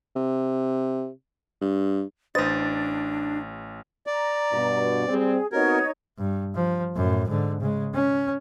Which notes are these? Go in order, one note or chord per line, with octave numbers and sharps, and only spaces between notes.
C3
G2
A1 D4 B4 C5 D#5 A6
D5 A#5
G2 B2
G3 C4 G#4
B3 C4 D#4 F#4 A#4 C#5 G#6
G2
F3
F#2 A2
G#2 D3
C#3 G#3
C#4